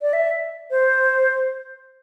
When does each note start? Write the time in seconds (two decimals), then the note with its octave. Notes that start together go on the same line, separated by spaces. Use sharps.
0.02 D5
0.13 E5
0.71 C5